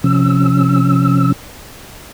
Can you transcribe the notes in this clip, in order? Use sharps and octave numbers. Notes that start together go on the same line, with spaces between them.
C3 F3 C#4 E6